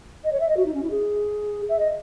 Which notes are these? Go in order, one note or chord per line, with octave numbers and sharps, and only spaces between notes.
D#5
C#5
E5
D#5
F#4
D#4
C#4
E4
G#4
E5
D#5